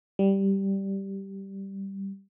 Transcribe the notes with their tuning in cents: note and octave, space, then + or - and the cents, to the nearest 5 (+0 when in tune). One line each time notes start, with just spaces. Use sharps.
G3 -5